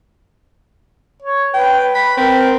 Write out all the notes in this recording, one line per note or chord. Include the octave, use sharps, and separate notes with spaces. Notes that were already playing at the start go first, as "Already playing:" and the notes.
C#5
B4 G5
B5
C4 A#4